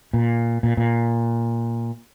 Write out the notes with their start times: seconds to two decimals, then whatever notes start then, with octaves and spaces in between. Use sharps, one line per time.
0.13 A#2
0.63 A#2
0.77 A#2